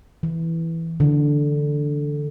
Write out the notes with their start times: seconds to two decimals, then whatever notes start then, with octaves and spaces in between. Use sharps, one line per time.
0.23 E3
1.00 D3